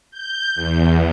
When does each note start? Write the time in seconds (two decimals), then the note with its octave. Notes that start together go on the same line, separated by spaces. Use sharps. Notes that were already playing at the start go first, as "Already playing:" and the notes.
0.11 G6
0.55 E2